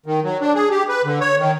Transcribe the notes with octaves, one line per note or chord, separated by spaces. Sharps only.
D#3
F#3
D4
G#4
G4
B4
D3
C#5
D#3